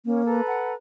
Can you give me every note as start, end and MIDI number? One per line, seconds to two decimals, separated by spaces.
0.06 0.41 58
0.06 0.26 61
0.26 0.75 69
0.26 0.75 71
0.26 0.75 82
0.48 0.72 78